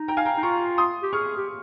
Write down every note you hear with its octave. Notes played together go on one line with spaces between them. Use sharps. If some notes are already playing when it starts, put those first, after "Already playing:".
Already playing: D#4
G5 A#5
F5 G#5
G5 A#5
D#4
F4 A#5 C#6
C6 D#6
G4
G#4 C#6 F6
G4